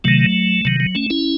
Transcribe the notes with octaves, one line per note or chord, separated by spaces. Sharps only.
C3 D#3 F#3 A3
C3 D#3 F#3
F#3
A3 C#4
C#4 E4